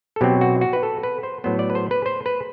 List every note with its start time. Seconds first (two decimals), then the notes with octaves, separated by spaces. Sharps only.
0.16 A4
0.21 B2 F#3 C4 G4
0.41 F#4
0.61 F#4
0.73 B4
0.83 A4
1.03 B4
1.23 C5
1.44 A2 F#3 B3 C5
1.59 D5
1.70 B4
1.75 C5
1.91 B4
2.06 C5
2.26 B4